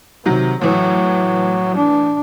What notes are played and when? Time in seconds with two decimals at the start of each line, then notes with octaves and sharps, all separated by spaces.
0.26 C3 D#3 F#3
0.61 A2 E3 F#3
1.77 D4